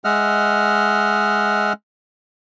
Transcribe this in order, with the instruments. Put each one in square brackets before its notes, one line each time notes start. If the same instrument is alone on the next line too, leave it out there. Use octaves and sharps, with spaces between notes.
[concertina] G#3 D#5 E5 F#5 F6